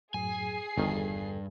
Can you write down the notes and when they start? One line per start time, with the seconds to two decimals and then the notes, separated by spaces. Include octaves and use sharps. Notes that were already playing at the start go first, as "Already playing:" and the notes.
0.14 F#2 A2 F#3 G#4 G#5 C7
0.78 G1 E2 G2 D#3 A4